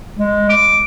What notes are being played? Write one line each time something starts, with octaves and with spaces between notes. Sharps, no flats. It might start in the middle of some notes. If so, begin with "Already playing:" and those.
G#3
D6